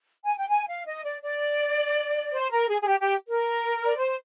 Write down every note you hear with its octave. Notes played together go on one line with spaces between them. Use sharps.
G#5
G5
G#5
F5
D#5
D5
D5
C5
A#4
G#4
G#4
G4
G4
A#4
D5
C5